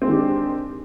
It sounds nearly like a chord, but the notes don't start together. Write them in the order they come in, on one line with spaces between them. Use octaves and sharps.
C4 G#3 D#3 G4 D4